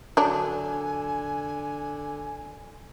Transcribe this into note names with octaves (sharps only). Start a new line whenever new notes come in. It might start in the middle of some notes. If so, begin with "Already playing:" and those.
D3 F#3 D4 G#5